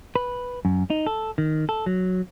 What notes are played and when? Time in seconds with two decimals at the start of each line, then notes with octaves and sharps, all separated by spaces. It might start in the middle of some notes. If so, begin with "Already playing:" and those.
0.16 B4
0.65 F#2
0.90 D#4
1.07 A4
1.38 D#3
1.69 A4
1.86 F#3